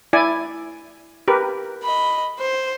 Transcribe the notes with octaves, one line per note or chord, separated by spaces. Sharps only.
E4 D5 G#5
G4 A#4 B4
D#5 B5
C5